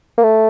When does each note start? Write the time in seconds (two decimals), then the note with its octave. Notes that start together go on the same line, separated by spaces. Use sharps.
0.18 A#3
0.23 A3